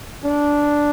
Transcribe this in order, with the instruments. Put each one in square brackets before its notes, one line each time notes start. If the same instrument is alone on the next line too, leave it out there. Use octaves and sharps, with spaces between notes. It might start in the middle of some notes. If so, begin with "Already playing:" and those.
[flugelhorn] D4